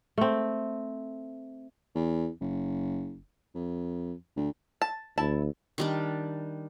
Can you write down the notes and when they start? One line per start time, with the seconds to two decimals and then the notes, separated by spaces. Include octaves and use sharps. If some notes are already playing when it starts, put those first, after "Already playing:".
0.18 A3 C4
1.95 E2
2.41 F#1
3.55 F2
4.36 D2
4.82 A5
5.18 D2 E4 A5
5.78 D#3 G3 D4